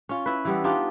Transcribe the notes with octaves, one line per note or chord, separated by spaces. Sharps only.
C#4 F4
E4 B4
E3 G3 B3
D4 D#4 F4 G4